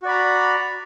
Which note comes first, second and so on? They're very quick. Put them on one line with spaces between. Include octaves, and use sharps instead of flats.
F#4 D5 B5 A#5